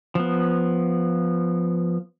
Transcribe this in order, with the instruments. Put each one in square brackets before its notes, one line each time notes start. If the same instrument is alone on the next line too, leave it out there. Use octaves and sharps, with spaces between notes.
[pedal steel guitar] F3 B3